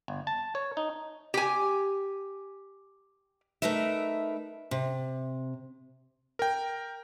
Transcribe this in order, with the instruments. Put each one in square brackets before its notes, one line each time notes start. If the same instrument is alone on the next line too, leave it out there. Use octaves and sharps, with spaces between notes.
[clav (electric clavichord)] G1
A5
C#5
D#4
[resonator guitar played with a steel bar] G4 G#5
[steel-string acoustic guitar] A3 D#4 A#4 B4 E5
C3
[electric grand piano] A#4 G5